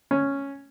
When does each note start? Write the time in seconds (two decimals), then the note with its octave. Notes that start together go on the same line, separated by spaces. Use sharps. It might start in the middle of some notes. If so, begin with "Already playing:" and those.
0.11 C#4